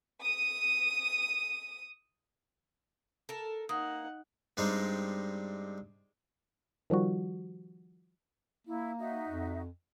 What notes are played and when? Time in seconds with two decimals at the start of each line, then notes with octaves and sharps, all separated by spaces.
0.21 D#6 D#7
3.29 A4 A#4
3.69 A#3 D#4 F#5 D#6
4.57 G2 G3 G#3 C4 D#4
6.90 D#3 F3 G3 F#4
8.67 A#3 E4
8.99 D#4 F#4 E5
9.28 F2